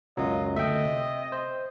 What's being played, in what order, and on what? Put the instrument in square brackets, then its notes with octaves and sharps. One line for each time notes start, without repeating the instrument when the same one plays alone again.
[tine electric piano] C#2 F#2 F#3 [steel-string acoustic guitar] B2 F4 [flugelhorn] D#5
[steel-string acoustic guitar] D3 A3 [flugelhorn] D#5 [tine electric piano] E5 G5
[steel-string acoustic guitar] C3
[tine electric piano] C5